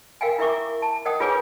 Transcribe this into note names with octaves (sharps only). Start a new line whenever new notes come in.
A#4 F5 G5 G#5
E4 A#4 E5 C#6 D6
A5
A#4 D#5 F#5 G5 D#6
F4 G#4 B4 C#5 G#5 D6